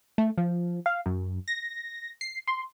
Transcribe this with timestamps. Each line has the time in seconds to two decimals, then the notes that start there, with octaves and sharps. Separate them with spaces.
0.18 A3
0.38 F3
0.86 F5
1.06 F#2
1.48 A#6
2.21 C7
2.47 C6